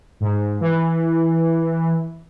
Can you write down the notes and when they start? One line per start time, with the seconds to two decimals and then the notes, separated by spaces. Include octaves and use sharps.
0.20 G#2
0.61 E3